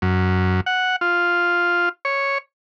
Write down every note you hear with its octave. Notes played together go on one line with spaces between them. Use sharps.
F#2
F#5
F4
C#5